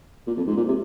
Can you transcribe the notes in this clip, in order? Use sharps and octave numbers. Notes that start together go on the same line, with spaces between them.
A#2
F2
G#2
A#2
C3